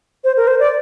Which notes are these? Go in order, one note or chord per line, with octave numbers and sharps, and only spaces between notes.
C5
A#4
C5
D5